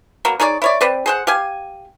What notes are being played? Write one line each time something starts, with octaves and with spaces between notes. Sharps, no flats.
F#3 A#3 B3
D#4 G#4 C#5 D5
E4 C#5 D5
C4 B4 D5
G#4 C5 F#5
G4 F5 G#5